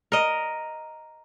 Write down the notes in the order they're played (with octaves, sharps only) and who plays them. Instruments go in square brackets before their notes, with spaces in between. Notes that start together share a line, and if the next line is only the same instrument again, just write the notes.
[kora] A#4 D#5